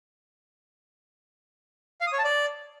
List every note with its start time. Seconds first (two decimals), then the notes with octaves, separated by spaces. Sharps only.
2.01 F5
2.07 D#6
2.13 C#5
2.18 A5
2.24 D5